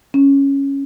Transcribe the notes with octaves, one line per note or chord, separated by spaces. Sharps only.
C#4